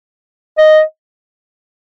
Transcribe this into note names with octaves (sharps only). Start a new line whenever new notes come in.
D#5